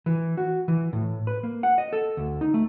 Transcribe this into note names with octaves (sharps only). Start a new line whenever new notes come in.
E3
F#4
E3
A2
B4
A#3
F#5
D#5
A4
D2
D#4
A3